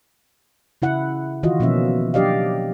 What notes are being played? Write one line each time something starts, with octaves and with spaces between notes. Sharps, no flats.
C#3 E4 F#5
D#3 E3 F4 F#4 D#5
B2 F3 A#3 C#4 E5
F#3 D4 G4 D5 D#5 F5